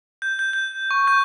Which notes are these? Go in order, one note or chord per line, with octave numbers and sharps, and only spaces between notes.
G6
G6
G6
C#6
G6